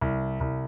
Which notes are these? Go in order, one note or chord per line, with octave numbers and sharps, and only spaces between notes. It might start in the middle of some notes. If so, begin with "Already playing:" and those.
C2
C2